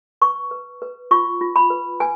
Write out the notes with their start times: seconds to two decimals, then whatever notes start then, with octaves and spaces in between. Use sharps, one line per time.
0.21 B4 C#6
0.51 B4
0.82 B4
1.11 F4 C#6
1.41 F4
1.56 B5
1.70 B4
2.00 B4 G#5